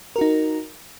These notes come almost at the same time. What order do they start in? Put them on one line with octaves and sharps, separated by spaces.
A#4 F#4 D#4